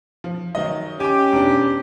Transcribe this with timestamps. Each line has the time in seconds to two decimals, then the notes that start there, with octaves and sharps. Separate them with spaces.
0.24 F3
0.55 D#3 F#3 D#5
1.00 C#4 G4 G#5 D6
1.33 E1 D4